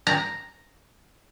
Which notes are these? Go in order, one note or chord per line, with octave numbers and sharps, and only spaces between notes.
A#5